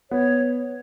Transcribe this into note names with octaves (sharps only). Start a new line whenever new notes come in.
B3 C#5